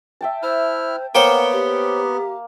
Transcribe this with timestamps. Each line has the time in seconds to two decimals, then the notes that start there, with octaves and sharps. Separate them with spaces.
0.21 E5 G5 A5
0.43 E4 C5 F6
1.15 A#3 B3 C5 C#5 F#5 G5
1.52 G4